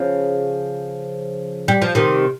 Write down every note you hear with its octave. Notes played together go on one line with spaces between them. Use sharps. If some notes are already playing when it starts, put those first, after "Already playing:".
Already playing: C#3 F3
G3
F3
C3 D#3